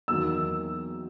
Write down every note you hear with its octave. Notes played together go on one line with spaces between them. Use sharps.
E2 D#3 F#3 A#3 E6